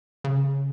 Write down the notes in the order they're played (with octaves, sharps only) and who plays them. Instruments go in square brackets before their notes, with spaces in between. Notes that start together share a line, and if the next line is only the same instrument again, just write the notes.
[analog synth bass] C#3